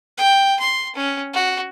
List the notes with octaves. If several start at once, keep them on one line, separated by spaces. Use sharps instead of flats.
G5
C6
C#4
F#4